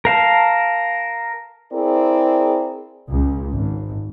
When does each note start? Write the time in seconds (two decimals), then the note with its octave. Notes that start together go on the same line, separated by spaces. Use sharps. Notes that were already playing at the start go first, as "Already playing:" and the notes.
0.05 A#4 F5 A5
1.72 C4 E4 G#4 A#4 D5
3.08 C#2
3.53 G#1